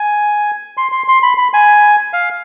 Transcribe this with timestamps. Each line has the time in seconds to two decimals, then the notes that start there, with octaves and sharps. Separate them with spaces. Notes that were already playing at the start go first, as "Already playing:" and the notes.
Already playing: G#5
0.77 C6
0.92 C6
1.08 C6
1.23 B5
1.38 B5
1.54 G#5
2.13 F5